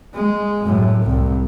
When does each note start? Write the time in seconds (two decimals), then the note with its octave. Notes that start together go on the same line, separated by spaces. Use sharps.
0.14 G#3
0.64 F#2 A2
1.03 C2